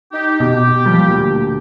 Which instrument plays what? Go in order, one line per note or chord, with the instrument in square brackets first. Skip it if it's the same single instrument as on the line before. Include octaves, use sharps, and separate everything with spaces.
[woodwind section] D#4 G4
[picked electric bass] B2 [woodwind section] G4
[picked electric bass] A#2 F3 G3
D2 A#2